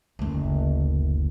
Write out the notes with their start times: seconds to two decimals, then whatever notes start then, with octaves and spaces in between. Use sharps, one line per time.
0.19 F#1 D2